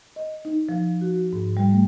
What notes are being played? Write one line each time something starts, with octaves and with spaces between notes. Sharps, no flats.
D#5
D#4
F3
F#4
G#2
G3
A3